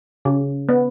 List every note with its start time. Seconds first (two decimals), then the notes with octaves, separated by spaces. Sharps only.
0.25 C#3
0.69 B3